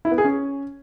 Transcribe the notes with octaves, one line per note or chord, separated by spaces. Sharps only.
E4
B3
G#4
C#4